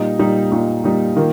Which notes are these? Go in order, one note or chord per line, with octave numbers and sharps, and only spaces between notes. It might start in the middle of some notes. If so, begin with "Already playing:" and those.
Already playing: A#2 G3 D#4
A#2 G3 D#4
A#2 G3 D#4
A#2 G3 D#4
D#3 A#3 F4